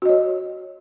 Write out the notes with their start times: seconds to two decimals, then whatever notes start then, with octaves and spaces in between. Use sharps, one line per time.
0.02 F#4
0.05 D#5
0.09 C#5